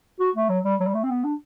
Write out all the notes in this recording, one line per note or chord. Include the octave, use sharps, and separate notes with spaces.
F#4
A3
F#3
G3
F#3
G3
A3
C4
B3
D4